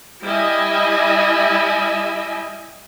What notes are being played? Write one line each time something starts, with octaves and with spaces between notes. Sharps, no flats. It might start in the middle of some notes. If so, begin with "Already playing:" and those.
G3 E4 D#5 E5 G#5